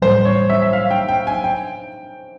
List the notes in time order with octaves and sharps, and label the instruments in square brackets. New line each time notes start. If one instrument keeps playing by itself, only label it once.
[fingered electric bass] A2 E3 G3 [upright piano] C5
[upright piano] C#5
E5
E5
F5
G5
G5
G#5
G5